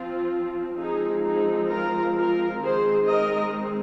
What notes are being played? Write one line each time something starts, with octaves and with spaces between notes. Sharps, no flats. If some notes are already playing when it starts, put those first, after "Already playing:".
Already playing: F3 C4 F4
F3 G#3 C4 D#4 G#4
D#4 G#4
F4 A#4
F4 A#4
D#3 G#3 C4 G#4 C5
A#4 D#5